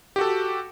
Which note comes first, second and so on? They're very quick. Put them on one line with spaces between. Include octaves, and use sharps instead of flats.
G4 F#4 A4